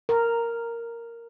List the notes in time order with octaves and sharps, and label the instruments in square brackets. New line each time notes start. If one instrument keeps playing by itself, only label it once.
[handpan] A#4